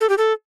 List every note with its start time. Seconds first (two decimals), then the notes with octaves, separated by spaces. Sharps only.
0.01 A4
0.09 G4
0.18 A4